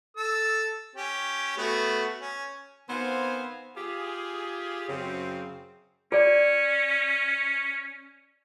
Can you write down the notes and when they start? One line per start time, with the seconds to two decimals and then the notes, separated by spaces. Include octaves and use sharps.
0.17 A4 E6
0.96 C#4 G4
1.57 A3 B3 F#4
2.21 C#4
2.90 D#3 B3 C4 C5 F5 G#5
3.77 F4 G4 G#4
4.89 F#2 C#3 C4
6.12 C#4 G#4 D5